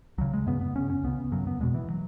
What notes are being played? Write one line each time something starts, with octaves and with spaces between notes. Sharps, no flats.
C#2 C#3 F#3
G#3
F#2 C#3 B3
B3
F#2 C#3 C#4
C#4
C#2 C#3 B3
F#2 C#3 F#3
B3
E2 B2 G#3
E3
F#3